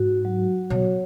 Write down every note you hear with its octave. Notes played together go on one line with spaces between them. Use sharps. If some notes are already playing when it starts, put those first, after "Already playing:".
Already playing: G#2 F#4
F#3
B2 C#5